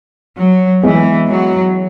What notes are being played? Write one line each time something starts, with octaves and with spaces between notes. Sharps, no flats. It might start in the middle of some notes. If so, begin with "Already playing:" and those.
F#3
E3 G#3 B3 E4 G#4 D#5
F#3